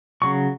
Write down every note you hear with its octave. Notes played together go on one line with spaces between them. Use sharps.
C#3 F#3 C#6